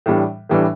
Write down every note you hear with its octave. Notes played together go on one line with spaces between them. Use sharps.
A2 E3 G3 D4
A2 E3 G3 D4